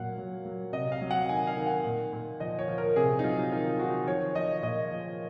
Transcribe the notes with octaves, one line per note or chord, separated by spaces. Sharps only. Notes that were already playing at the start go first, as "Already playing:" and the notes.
Already playing: A#2 F#3 F5 F#5
F#3
F#3
C3 D#5
F5
F#3
F#5
D#3 G#5
F5
D#3
F#5
A#2
A#2
F3 D#5
C#5
F3
A#4
C3 G#4
D#4
F#3 F4
D#3 F4
D#3 F#4
F3 C#5
F3 D#5
A#2 D#5
F3